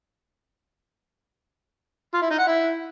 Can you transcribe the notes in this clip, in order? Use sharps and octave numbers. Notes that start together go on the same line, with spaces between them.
F4
E4
D#4
F#5
E4